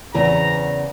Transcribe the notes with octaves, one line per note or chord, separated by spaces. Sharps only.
E2 C#3 B3 C4 A#5